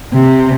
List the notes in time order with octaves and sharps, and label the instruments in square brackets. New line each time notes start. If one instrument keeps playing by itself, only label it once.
[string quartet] C3